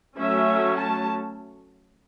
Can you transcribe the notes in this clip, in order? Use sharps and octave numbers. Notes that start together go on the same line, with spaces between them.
F#3 A3 C#4 E5
A5